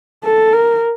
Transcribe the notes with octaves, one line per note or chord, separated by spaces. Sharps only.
A4
A#4